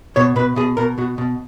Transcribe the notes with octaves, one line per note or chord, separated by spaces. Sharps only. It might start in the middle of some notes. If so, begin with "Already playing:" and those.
B2 C#5
B2 B4
B2 G#4
B2 A#4
B2 F#4
B2